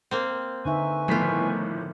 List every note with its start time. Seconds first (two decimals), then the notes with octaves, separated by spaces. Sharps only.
0.11 A#3 C4
0.65 D3 D#4 B4 E5 G#5 C#6
1.08 G1 A2 D#3 F3 F4 B6